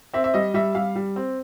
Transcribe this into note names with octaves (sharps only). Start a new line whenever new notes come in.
C4 E5
E5
G3 D#5
G3 E5
G3 F5
G3
C4